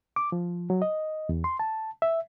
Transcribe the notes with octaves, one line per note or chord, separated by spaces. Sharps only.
D6
F3
F#3
D#5
E2
C6
A5
E5